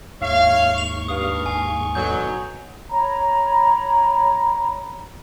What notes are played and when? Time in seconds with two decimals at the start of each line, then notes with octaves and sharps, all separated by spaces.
0.21 D#2 G#2 C#5 E5 F5 C#6
0.78 F7
1.08 G2 F5 D#6
1.46 G#5
1.95 B2 D3 F#3 G6
2.89 C#5 A#5 B5